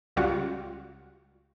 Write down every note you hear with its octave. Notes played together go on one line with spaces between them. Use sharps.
C#2 G3 F4 F#4